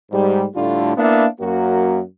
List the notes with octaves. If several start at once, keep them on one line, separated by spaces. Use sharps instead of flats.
G#2 G3
A2 D3 G3 A3 D4 F4
A#3 B3 D4 E4 E5 F5
F#2 A#3 F#4